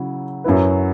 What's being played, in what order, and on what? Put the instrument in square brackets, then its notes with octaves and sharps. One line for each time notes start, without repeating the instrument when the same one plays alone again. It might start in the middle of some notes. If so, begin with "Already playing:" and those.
Already playing: [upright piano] C#3 F#3 E4
F#2 F#3 E4 B4